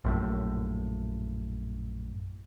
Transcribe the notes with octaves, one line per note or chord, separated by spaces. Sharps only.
A#1 F#2 A2